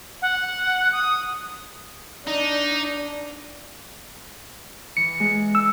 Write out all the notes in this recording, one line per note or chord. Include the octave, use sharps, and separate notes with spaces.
F#5
D#6
D4 D#4
E3 C#7
G#3
E6